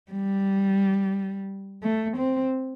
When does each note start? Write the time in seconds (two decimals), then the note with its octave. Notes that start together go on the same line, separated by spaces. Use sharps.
0.12 G3
1.83 A3
2.17 C4